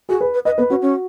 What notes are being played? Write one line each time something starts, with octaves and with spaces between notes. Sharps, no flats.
F#4 G#4
B4
B4
B4 D#5
B3 B4
C#4 F#4
C#4